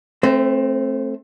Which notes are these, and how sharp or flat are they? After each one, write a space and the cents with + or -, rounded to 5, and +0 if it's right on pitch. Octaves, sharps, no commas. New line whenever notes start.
A3 +0 C4 +25 C5 -30